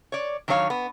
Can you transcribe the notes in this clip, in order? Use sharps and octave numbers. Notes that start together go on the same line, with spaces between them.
C#5 D5
D#3 F#3 D4 C#5 F5
B3